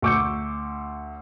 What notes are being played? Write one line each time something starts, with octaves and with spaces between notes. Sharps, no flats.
D2 C#6 D6 E6 G6 C#7